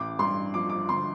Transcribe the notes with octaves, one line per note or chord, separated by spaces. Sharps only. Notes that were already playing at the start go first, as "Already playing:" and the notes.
Already playing: A1 D6
G2 C6
F3 D6
D6
D3 C6